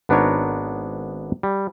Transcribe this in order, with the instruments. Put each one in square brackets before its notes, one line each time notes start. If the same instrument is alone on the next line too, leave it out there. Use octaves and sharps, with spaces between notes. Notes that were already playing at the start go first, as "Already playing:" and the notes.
[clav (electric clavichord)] G#1 B3 D4 D#4 A#4 C#5
G3